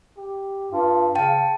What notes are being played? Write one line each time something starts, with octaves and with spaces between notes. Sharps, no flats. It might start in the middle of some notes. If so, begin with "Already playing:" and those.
G4
G2 F4
C#3 F5 G5 A5